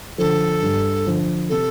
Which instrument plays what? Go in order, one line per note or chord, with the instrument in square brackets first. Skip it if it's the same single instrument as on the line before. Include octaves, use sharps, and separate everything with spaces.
[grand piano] D3 F3 [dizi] A4
[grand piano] G2
D3 F3
[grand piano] C3 [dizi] A4